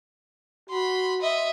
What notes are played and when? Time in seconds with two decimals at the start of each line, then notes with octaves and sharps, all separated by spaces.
0.70 F#4 B5 C6
1.21 D#5 E5